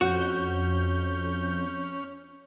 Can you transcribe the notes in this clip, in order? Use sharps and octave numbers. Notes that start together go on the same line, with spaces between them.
F2 C#4 F#4 G6